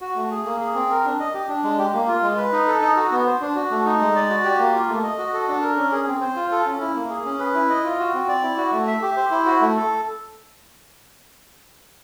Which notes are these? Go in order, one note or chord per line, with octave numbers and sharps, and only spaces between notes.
F#4
A3
G#4
A#3
G#4
C4
A#4
D4
D#5
G4
D4
G#3
G4
A#3
F4
G#3
B4
D#4
A4
D#4
F#4
B3
C5
D4
F#4
A3
D#4
G#3
D5
F#4
G4
A#3
F4
A3
D#5
F#4
A4
D4
A#4
C#4
G#4
C4
C5
F4
A4
C#4
E4
A#3
G#4
C#4
B4
E4
D#5
F4
F#4
C4
D5
E4
F#4
A3
E5
G4
C5
E4
F#4
A3
A4